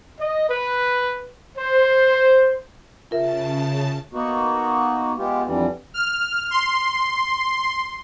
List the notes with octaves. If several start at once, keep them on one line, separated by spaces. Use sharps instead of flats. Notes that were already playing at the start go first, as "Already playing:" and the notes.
D#5
B4
C5
C#3 F4 A#4 E5 A5
A#3 B3 D#4 F#4
G#3 B3 F4 G4
F2 D3 E3 G3
F6
C6